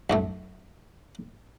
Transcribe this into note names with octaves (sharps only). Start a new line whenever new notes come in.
B1 F#2 A3